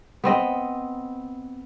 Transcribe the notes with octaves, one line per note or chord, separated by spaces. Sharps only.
B3 C4 D#5